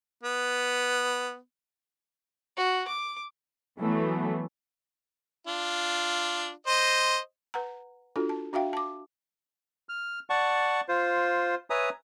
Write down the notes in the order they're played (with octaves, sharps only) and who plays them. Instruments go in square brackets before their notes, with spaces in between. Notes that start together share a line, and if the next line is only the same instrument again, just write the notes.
[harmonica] B3
[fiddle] F#4
D6
[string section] E3 F#3 A3 B3
[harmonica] D4 F4
C5 D#5
[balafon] B4 F#5 A#5
D4 F4 F#4 A4
A5
D4 F#4 E5 F5 G5
A5 D6
[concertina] F6
D5 F#5 A5 C#6
F4 C5
B4 C#5 E5 G#5 A#5 D#6